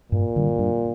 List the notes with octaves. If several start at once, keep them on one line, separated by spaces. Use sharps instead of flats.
G2 A#2
D3 G3
G2